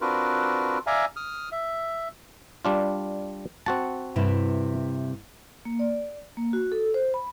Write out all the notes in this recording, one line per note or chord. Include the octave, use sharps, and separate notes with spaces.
C4 D4 F4 F#4 A#4 B4
D5 E5 F5 G#5 A#5
D#6 F6
E5
G3 D4 F4
C4 F#4 F#5 A5
G2 C3 E4
A#3
D5
A#3
F#4
A4
C5
B5